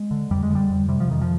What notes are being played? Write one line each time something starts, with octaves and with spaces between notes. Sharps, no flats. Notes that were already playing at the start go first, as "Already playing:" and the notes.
Already playing: G#3
D3
F2 G3
G#3
D3 G3
F2
C3 G3
F3
F2 D#3
F3